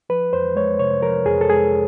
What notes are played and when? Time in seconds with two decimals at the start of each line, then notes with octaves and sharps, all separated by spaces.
0.09 F3 B4
0.33 F2 C5
0.56 G#3 C#5
0.79 C3 C#5
1.02 F3 A#4
1.26 F2 G#4
1.41 A4
1.50 G#3 G#4